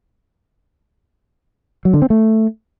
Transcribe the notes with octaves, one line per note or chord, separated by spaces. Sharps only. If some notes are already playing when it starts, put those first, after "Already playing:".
F#3
D3
C4
A3